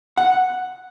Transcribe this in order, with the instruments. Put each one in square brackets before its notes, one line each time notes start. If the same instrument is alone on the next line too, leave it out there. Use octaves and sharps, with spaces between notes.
[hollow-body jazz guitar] F#5